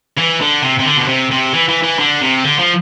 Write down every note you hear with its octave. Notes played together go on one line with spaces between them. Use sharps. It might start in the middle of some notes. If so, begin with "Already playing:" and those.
E3
D3
C3
C3
D3
B2
C3
C3
E3
E3
E3
D3
C3
D3
F3